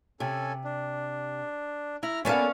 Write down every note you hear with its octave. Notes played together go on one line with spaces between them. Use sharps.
C3 C#4 A4 G#5
D4
E4 A#5 F6
A#3 B3 C#4 A4 C#5 D5 F5 G#5